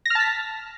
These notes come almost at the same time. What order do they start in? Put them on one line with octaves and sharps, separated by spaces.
A#6 F6 A5 B6